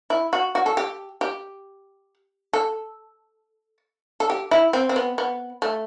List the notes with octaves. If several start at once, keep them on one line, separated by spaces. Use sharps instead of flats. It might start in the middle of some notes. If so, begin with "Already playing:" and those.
E4
F#4
F#4
A4
G4
G4
A4
A4
G4
E4
C4
C4
B3
B3
A3